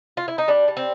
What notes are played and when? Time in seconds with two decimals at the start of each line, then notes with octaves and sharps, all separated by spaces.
0.17 F4
0.28 E4
0.38 D#4
0.48 G3 D4
0.68 G3
0.77 C4